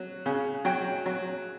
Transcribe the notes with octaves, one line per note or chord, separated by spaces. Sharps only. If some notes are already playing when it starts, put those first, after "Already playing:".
Already playing: F#3
C#3
F#3 G5
F#3